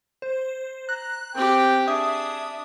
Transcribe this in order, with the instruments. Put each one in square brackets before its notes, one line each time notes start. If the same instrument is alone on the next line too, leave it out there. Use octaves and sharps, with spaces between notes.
[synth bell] C5
[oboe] A#5 [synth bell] F#6
[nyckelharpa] C4 G4 [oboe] G5
[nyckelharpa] D4 [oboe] G#4 [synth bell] E5 D#6